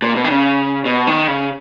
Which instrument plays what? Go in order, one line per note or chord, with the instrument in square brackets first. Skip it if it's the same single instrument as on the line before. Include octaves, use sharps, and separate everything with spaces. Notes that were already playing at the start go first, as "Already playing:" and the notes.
[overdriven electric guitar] A#2
B2
D#3
C#3
B2
D#3
C#3